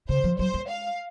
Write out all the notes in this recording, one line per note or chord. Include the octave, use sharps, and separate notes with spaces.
C#3 C5
F3
F#3 C5
G#3
F5